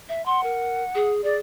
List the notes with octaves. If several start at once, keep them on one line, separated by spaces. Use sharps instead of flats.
E5
F#5 C6
A#4
G#4
G#4 D5